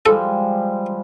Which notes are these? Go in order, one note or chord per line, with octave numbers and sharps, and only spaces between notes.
F3 G3 G#3 A4